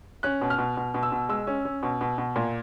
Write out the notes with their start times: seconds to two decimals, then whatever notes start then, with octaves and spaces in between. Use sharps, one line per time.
0.23 C#4 F#6
0.41 B2
0.50 F6
0.58 B2
0.77 B2
0.94 B2
1.03 E6
1.12 B2
1.29 G#3 E6
1.47 C#4
1.65 C#4
1.83 B2
2.01 B2
2.18 B2
2.36 A#2